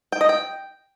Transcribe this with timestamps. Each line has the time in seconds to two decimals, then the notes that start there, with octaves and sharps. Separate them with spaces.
0.12 G5
0.21 D#5
0.29 G5